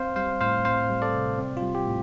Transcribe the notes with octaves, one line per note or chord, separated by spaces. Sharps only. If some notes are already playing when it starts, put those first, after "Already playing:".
Already playing: C4 C5 F5
G3 C5 F5
A2 C5 F5
C4 C5 F5
G3
A4 D5
C3
C4
F4
G3
G4
A2